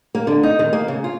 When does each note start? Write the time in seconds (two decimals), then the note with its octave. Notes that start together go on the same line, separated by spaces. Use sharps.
0.15 A#3
0.27 D3
0.43 D#4
0.59 D#3
0.73 A#3
0.88 C#3
1.04 F4